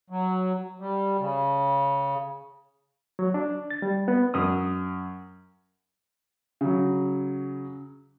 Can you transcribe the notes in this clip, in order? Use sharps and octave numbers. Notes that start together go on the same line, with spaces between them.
F#3
G3
C#3
F#3
D4
A6
G3
B3
F#2 D#6
C#3 F#3